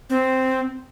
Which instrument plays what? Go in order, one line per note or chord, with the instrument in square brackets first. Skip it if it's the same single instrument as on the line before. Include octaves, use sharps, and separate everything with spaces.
[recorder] C4